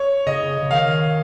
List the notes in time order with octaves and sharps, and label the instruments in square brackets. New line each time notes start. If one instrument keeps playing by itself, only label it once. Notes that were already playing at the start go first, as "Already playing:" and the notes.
Already playing: [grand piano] C#5
[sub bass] C#3 [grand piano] D#5
[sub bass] C#3
[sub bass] D#3 [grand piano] F5